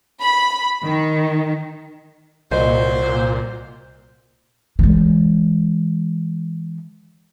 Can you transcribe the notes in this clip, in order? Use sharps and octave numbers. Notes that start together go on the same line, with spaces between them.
B5
D#3
C2 A#2 F#3 C5 D#5
E3 G#3